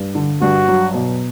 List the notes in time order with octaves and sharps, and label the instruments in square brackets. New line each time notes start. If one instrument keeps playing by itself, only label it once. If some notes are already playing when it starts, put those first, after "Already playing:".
Already playing: [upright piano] G2
D3
[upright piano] G2 [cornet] F#4
[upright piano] F#3
B2